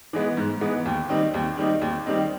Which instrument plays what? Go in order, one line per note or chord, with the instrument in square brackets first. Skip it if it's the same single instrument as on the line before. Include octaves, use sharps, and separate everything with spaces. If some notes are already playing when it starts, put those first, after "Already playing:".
[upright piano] E3 G#3 B3
G#2
E3 G#3 B3
D#2
D#3 G3 C4 D#4
D#2
D#3 G3 C4 D#4
D#2
D#3 G3 C4 D#4